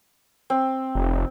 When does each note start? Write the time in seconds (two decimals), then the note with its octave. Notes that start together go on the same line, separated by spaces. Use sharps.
0.50 C4
0.95 F1